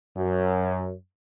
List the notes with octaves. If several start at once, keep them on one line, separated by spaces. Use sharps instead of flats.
F#2